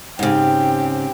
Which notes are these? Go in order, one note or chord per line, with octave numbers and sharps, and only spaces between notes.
G#2 C#3 C4 G4